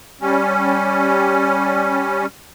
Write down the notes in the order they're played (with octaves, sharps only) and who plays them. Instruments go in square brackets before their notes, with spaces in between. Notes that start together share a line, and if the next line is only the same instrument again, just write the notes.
[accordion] G3 C#4